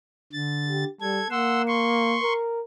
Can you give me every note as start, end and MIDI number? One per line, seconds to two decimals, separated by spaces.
0.33 0.84 50
0.33 0.84 93
0.68 0.89 67
1.01 1.21 55
1.01 1.27 69
1.01 1.27 92
1.31 2.17 58
1.31 1.62 78
1.31 1.62 84
1.31 1.62 88
1.67 2.33 84
1.67 2.33 85
2.22 2.61 70